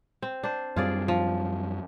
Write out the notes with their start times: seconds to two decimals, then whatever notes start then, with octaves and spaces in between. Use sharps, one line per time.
0.22 C4
0.43 D4 C5
0.76 F#2 G3 C4 F4 G#4 D5
1.08 F3